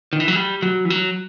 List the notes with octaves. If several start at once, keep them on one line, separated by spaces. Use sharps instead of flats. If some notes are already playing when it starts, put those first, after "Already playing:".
D#3
E3
F#3
G3
F#3
E3
F#3